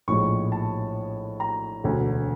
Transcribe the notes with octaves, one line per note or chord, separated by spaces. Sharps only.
A#1 A2 F3 G#3 C#6
A5
A#5
E1 D2 D3